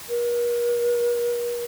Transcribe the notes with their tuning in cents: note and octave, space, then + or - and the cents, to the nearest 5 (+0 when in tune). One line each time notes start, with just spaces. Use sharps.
A#4 +45